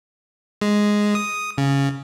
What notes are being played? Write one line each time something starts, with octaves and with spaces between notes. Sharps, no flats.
G#3
D#6
C#3